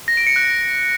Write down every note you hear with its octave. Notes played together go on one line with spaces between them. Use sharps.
A#6
D7
C#7
F#6